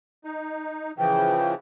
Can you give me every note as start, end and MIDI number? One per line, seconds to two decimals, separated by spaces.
0.24 0.91 63
0.98 1.54 49
0.98 1.54 52
0.98 1.54 53
0.98 1.50 79